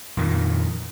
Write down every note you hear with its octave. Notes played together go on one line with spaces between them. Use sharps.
F2 A#2 D#3